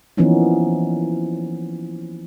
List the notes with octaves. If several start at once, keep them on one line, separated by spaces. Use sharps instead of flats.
E3 F3 A#3 B3 C#4 D#4